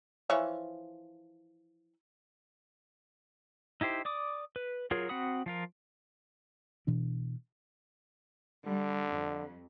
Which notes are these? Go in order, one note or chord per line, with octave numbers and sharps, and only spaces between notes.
E3 F3 C#5
D#4 E4 G4 C5
D5 D6 D#6
B4
F#3 F4 G#4 A#4 C#5
C4 F#4 F#5 B5 D#6
F3 F4 A#4
B2 E3 D4
D3 G3
F2